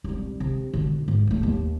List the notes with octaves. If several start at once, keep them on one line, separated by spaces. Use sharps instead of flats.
C2 G3
C3
B2 D3
G#2
F#3 A3
D#2